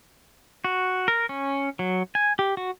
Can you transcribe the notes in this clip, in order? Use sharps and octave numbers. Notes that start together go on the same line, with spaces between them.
F#4
A#4
C#4
F#3
G#5
G4
F#4